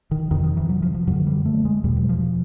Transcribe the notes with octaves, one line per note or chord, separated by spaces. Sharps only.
D#3
F2 C3 D#3
D#3
E3
F#3
F3
F3
F#2 D3 F#3
G3
A3
G#3
E2 B2 G3
F#3
F3